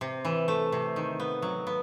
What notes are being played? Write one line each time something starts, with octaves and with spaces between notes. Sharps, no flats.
C3
E3
A3
C3
D#3
B3
F#3
B3